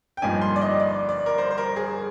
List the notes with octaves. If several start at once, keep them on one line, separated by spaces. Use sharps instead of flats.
G5
G1 G2 F3 A#3 D#4 G#5
C6
D5
D#5
D5
D5
A#4
C5
C5
A#4
G#4